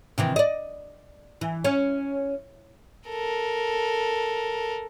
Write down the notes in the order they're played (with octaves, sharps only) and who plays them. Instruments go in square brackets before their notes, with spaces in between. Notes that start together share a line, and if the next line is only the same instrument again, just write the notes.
[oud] C3 D#3 E3
D5 D#5
E3
C#4
[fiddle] A4 A#4